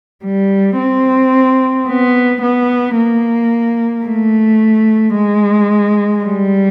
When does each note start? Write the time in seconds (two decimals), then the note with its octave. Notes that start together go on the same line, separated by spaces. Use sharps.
0.25 G3
0.79 C4
1.88 B3
2.42 B3
2.96 A#3
4.06 A3
5.16 G#3
6.24 G3